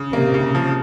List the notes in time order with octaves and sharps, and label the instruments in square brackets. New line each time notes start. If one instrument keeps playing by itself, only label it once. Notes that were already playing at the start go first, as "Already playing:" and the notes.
Already playing: [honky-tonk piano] C#3
[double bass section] C3 [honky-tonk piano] A#3
[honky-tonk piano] C#3
F3